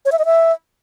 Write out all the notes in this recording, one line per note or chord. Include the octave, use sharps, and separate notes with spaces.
C#5
E5
D#5
E5